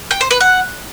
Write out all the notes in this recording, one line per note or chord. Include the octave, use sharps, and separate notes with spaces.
G5
C5
B4
F#5